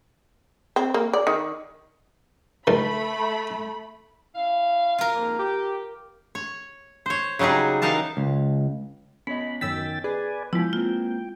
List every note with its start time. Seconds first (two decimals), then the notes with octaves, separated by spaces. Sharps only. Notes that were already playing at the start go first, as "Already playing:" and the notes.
0.76 C4
0.94 A#3
1.13 D5
1.27 D#3
2.67 C#2 D#3 A3 B5
4.35 C#4 E4 F5
4.98 F4 A#4
5.15 F2 G#2 A#3
5.39 G4
6.35 C#5
7.06 C5 C#5
7.39 C#3 F#3 G3 D#4 G#4
7.82 E3 D#4 A#4 F5 A5
8.17 C#2
9.27 B3 C#4 C#5 D#5 B5
9.61 F#2 D#3 G5 E6 A6 B6
10.04 G#4 B4 D5 G#5
10.53 F3 G#3 B3 E4 G5
10.73 A#3 C4 F4